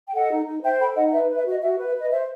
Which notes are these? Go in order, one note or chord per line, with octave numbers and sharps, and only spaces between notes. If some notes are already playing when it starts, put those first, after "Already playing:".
G5
A4 D#5 F#5
D#4
D#4
C5 E5 G5
A4 G5 B5
D#4 D#5 F#5
B4 E5
B4
E5
F#4 D#5
F#4 E5
B4
E5
B4 D#5
C5 E5